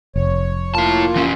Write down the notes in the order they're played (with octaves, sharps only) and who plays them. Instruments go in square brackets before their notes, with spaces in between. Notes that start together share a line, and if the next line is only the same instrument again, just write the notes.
[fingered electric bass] F1 [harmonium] C#5
[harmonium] A#3 F4 [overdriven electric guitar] E4 A5
[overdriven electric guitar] E3 C#4